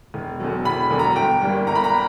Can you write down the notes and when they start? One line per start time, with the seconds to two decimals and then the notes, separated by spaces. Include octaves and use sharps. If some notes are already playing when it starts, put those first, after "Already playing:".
0.14 E1
0.40 E2 D3 F#3
0.65 E1 B5
0.90 E2 D3 F#3
0.99 A#5
1.16 G1 G5
1.41 G2 E3 G3 A#3
1.67 G1 A#5
1.75 B5
1.84 A#5